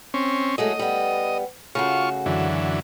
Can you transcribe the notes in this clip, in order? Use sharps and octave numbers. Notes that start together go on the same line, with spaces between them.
C4 C#4
F#3 G#3 A3 D#5
G3 B3
C#3 A3 F4 F#4 C#6
F#2 D3 E3